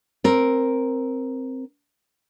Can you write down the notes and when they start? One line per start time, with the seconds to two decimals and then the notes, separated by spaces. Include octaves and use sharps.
0.24 C4 A#4